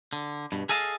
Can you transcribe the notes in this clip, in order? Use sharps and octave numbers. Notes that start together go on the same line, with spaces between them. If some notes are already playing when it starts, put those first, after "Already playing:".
D3
G2 B2
G#4 A4 D#5 F5 A5